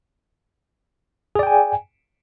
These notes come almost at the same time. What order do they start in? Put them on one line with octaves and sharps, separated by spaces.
G#4 D5 G5 G#5